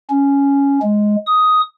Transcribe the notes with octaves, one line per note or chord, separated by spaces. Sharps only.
C#4
G#3
D#6